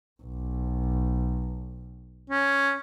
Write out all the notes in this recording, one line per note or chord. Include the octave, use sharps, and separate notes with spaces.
B1
C#4